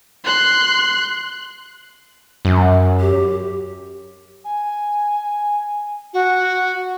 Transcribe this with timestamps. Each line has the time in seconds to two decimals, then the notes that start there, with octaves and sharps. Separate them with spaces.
0.24 C6 F#6
2.45 F#2
3.00 G4
4.44 G#5
6.13 F#4